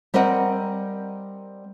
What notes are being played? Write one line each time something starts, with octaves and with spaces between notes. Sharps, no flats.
G3 C4 A#4 D#5 F#5